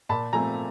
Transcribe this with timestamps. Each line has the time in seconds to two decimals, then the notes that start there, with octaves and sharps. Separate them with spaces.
0.09 A#2 A5 B5
0.33 F3 A3 C4 G#5 A#5